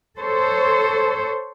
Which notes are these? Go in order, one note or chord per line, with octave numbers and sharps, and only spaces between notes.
A4 C5 C#5